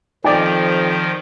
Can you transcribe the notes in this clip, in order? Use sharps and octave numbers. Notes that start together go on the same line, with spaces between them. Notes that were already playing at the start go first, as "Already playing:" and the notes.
F2 D#3 F3 D#4 D5 G5 D#6